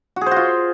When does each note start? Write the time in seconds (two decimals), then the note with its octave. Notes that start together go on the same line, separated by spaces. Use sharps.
0.16 F#4
0.21 G#4
0.26 C5
0.31 F#4
0.36 F4